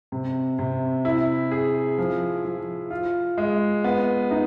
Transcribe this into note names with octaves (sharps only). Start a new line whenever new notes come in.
C3
C3
E4
G#4
F3
F3
F4
G#3
B3
D#4